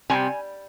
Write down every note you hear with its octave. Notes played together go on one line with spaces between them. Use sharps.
C3 G3 C4 G#5